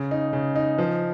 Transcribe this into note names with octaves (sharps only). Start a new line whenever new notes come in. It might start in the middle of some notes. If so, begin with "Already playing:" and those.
Already playing: C#3
D#4
C#3
D#4
F3